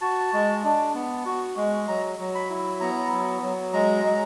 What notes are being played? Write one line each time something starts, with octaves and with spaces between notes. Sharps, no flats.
F#4 A5
G#3
D4
B3
F#4
G#3
F#3 A#5
F#3
B5
E4
B3 A#5
F#3
F#3
G#3 A#5
G#3